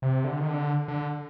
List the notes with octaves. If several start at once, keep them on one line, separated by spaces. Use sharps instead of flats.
C3
D3
D#3
D3
D3